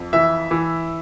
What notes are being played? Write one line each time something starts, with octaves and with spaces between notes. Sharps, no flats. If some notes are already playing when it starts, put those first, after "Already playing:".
Already playing: F2
E3 E5
E3